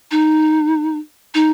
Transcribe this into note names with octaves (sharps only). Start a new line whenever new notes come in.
D#4
D#4